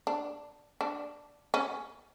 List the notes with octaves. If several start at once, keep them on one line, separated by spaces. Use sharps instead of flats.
D4
D4
C#4